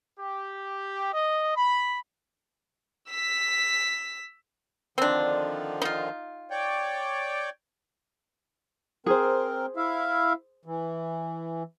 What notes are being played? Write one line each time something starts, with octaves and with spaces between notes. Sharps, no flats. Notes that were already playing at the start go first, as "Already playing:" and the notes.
G4
D#5
B5
E6 B6
D3 D#3 F3 C4 D4
D#4 F4
C#5 D5 G5
C4 G#4 A#4 C5
E4 E5 F5
E3